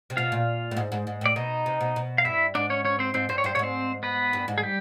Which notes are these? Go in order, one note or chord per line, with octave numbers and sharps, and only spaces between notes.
C3
B2 F4 F5
A#2
A2
G#2
G#2
G#2
A2 D5
B2 D#4 D#5
C3
B2
B2
F5
G2 E4 E5
G#2 D4 D5
C#4 C#5
C#4 C#5
C4 C5
G#2 C4 C5
G2 C5
C#5
G2 C5
G2 C#5
G#2 C4 C5
B3 B4
G2
G#2
G#4
G3 G4